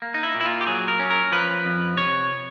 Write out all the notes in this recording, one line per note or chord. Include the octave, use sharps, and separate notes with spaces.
A#3
D#4
E4
A#2
E4
F4
G4
F#3 G#4
A#4
C#4
A#4
F3 B4
F2
C3 C#5